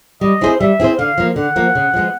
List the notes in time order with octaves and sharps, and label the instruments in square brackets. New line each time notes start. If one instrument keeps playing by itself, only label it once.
[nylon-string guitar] G3 [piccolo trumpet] D#5
[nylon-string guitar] C4 E4 G#4 C5
[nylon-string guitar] G3 [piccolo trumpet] E5
[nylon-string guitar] C4 E4 G#4 C5
[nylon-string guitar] D3 [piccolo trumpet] F5
[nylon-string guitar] F3 A#3
[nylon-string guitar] D3 [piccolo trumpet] F#5
[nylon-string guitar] F3 A#3
C#3
F3 G#3 B3